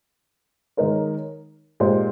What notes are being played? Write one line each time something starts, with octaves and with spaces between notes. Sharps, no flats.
D#3 G#3 D#4 A#4 C#5
A#2 G#3 D#4 G4 C5